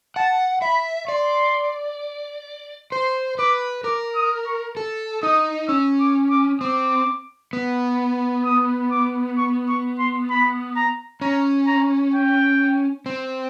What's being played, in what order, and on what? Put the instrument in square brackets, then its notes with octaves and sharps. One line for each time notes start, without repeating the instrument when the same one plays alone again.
[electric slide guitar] F#5 [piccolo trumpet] A5
[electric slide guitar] E5 [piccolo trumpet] B5
[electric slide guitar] D5 [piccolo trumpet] C6
[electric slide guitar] C5 [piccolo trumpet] C6
[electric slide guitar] B4 [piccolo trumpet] D6
[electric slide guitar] A#4 [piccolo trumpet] D6
[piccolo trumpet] D#6
C#6
[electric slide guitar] A4
[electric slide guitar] D#4 [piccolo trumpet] D#6
[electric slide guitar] C#4 [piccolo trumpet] E6
[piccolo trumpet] D6
D6
[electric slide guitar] C4 [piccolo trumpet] D6
[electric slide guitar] B3
[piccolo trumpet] D#6
D6
C#6
C#6
C6
B5
A#5
[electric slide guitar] C#4 [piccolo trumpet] A#5
[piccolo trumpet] A#5
G5
[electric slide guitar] C4